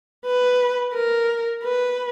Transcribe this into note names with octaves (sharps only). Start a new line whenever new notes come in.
B4
A#4
B4